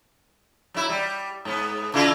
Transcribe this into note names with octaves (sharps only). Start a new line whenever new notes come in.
F#3 E4
G3
G#2 B3
C#3 E4 F4